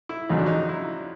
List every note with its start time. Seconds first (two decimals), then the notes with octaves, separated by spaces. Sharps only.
0.09 E4
0.29 F2 C#3 F#3 D#4
0.38 D4
0.46 D#4
0.69 E4